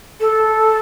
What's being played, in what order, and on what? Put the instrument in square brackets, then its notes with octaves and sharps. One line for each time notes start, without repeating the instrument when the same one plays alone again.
[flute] A4